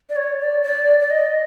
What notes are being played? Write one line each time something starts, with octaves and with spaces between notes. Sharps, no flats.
D5
C#5
D5
D5
D5
D#5